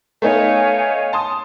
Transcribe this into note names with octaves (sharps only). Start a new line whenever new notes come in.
A3 B3 D#4 C#5 F5 G#5
A5 C6 D#6